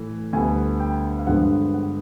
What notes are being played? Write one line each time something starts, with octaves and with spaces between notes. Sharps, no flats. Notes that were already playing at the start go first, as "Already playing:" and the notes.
Already playing: A2 E3 A3
D2 D3 G3 B3 G#5
G5
F5
G2 D3 F3 G#3 B3 F#5
F#5